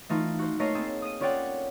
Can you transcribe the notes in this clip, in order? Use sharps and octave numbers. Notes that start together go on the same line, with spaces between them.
E3 A3 D#4 F4
F#4 C5
A3 A#3 C#5 D#5 F5 C7
A#3 C4 G#4 A4
D#6 D#7
C#4 F4 C#5 D5 F#5 G5